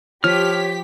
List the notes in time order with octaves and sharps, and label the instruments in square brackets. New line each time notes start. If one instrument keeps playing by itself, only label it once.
[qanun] F3 [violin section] G4 B6 [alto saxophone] C#5 [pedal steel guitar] F6